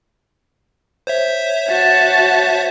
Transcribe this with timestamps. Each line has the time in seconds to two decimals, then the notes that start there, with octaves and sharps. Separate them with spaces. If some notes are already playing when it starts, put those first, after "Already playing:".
1.07 C5 C#5 E5
1.68 F#4 A5